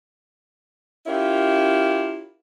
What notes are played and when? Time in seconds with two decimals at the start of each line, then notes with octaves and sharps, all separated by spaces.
1.06 C#4 E4 F4 G4 A#4